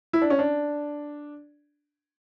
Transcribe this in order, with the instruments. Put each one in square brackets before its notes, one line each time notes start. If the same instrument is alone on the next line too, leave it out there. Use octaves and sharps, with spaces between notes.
[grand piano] E4
D4
C#4
D4